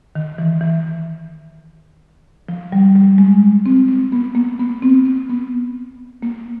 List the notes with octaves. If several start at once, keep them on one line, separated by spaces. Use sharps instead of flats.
D#3
E3
E3
F3
G3
G3
G#3
C4
C4
B3
A#3
B3
C4
C4
B3
A#3